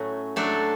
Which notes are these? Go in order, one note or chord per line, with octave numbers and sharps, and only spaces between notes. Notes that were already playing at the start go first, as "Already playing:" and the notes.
Already playing: A2 F#3 A3 C#4 F#4
F#3 A3 D4 A4